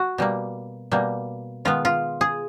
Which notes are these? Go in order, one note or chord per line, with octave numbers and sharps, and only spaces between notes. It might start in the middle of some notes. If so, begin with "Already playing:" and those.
Already playing: F#4
B2 G3 A#3
B2 G3 A#3
D#3 G#3 B3 F4
F4
G#4